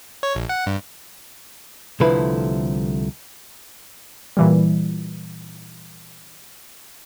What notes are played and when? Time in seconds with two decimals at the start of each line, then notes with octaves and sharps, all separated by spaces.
0.23 C#5
0.35 A#1
0.49 F#5
0.66 G2
2.00 C2 D3 F3 A3 E4 B4
4.37 A#2 E3 G3